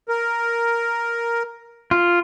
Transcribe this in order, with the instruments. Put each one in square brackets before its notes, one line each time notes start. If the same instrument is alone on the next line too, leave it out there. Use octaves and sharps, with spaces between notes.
[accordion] A#4
[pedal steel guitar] F4